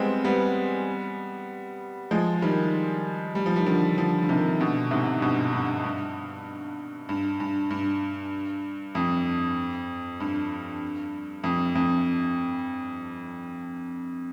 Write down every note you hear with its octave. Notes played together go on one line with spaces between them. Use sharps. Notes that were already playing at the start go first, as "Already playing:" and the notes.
Already playing: G3 G#3 B3 C4
G3 B3
F3 G#3
D#3 G3
G3
F3
D#3 G3
D3 F3
D3 F3
D3
C3 D#3
B2 D3
G#2 C3
G2 B2
G2
G2
G2
G2
G2
F2
G2
F2
F2